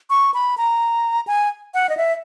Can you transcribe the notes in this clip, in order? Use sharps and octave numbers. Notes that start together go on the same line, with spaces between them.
C#6
B5
A#5
G#5
F#5
D#5
E5